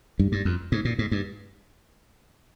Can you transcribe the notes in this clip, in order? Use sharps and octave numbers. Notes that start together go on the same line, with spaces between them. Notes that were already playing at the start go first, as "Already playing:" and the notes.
G2
G2
F2
G#2
A#2
G#2
G2